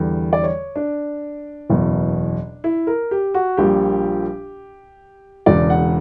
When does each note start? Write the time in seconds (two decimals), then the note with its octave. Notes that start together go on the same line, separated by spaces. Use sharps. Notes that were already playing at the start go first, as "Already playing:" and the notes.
Already playing: E2 D3 G3
0.33 D5
0.44 C#5
0.76 D4
1.70 F#1 E2 B2
2.64 E4
2.87 A#4
3.11 G4
3.34 F#4
3.57 A#1 A#2 G3 G4
5.46 E1 E2 C#3 D5
5.70 F#5